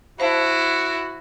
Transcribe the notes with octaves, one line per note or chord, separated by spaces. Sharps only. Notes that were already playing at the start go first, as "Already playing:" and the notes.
E4 F#4 C5 F5 A5